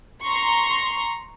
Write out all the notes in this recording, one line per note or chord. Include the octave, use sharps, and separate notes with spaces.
A#5 C6 C#6